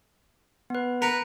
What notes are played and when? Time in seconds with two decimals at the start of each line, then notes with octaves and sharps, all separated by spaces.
0.70 B3 B4
1.02 A#4 B4 C#7